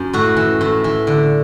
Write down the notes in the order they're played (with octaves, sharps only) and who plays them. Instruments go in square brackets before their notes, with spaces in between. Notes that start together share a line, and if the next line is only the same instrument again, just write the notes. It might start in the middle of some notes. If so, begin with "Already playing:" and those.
Already playing: [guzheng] F#2
A2 F#4
E3
A2
E3
D3